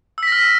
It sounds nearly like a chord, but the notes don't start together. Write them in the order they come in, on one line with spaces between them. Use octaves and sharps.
E6 B6 A#6 F6